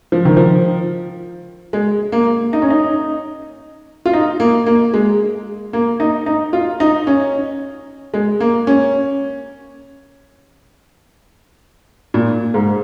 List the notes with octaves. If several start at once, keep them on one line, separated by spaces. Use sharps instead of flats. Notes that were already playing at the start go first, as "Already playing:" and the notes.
F3
D#3
F3
G#3
A#3
D#4
C#4
D#4
F4
D#4
A#3
A#3
G#3
A#3
D#4
D#4
F4
D#4
C#4
G#3
A#3
C#4
A#2
G#2